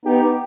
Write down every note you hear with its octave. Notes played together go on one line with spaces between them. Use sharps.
B3 D#4 G4